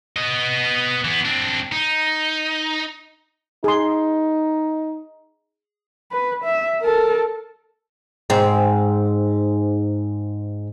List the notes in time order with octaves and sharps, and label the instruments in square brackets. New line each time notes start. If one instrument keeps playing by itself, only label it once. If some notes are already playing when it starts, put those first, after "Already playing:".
[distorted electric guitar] B3 D#5
E3 B3
C4 D4
D#4
[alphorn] D#4 [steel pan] G#4 C6
[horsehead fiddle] B4
E5
A4 A#4
[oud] G#2 C4